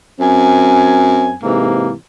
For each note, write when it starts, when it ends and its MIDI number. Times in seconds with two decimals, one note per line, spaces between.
0.19 1.33 42
0.19 1.33 60
0.19 1.33 80
1.42 1.92 44
1.42 1.92 48
1.42 1.92 52
1.42 1.92 58